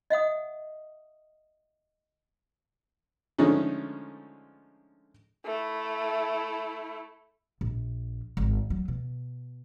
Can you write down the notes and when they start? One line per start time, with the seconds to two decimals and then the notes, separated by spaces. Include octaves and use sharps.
0.10 D#5 E5 F#5 D#6
3.38 D3 F3 G#3 A3 C#4 D#4
5.45 A3 E4
7.61 A#1
8.37 G#1
8.70 F#3
8.88 B2